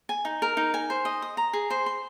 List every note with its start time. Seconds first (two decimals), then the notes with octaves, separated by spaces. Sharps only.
0.09 G#5
0.25 D#4
0.42 A#4
0.57 D#4
0.74 G#5
0.90 C5
1.05 D#5
1.22 D#6
1.37 A#5
1.53 G#4
1.70 C5
1.86 C6